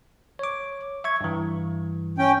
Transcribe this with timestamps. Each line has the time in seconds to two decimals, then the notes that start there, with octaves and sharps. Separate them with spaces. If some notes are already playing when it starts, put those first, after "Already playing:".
0.39 C#5 D6
1.04 E5 C#6 G#6
1.21 G2 E3
2.18 C#4 G5